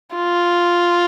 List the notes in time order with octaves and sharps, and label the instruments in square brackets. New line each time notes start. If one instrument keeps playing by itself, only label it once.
[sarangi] F4